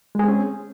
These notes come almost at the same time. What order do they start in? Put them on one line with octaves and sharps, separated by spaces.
G#3 G#4 C4 C#4